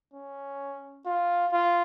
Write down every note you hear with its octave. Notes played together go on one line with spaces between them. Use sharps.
C#4
F4
F4